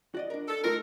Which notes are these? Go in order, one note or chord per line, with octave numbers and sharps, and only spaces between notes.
F#4 D5 D#5
D4 A#4
A4
A3 D#4 F4 A#4